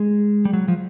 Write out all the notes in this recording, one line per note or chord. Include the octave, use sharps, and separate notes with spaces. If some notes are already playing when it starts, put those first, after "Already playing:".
Already playing: G#3
G3
F#3
F3